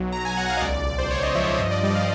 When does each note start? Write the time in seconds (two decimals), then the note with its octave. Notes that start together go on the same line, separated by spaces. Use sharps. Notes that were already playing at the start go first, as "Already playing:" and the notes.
Already playing: B1 F#3
0.12 F#3 A#5
0.25 G#5
0.37 B1 F#5
0.49 F5
0.57 D#5
0.61 C#2 D5
0.86 C#2 D5
0.99 C5
1.10 C#2 C#5
1.23 D#5
1.35 F3 E5
1.47 D#5
1.59 G2 D#5
1.71 D5
1.83 G3 D#5
1.95 F5